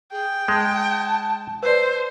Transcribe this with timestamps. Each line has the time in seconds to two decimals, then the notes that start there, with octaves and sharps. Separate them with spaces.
0.12 G#4 G5
0.48 G#3 A5
1.63 B4 C5 D5